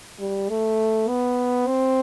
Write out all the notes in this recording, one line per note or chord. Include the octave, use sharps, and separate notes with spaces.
G3
A3
B3
C4